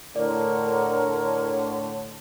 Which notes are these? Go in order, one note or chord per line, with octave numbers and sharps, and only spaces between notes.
A2 D3 A#4 C#5 D5